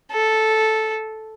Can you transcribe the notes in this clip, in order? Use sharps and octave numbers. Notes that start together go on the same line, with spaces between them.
A4